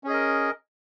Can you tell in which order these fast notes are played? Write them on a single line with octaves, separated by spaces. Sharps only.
C#4 G#4 D#5 A#4